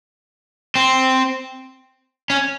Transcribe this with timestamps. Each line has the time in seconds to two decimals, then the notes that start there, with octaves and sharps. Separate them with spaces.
0.75 C4
2.30 C#4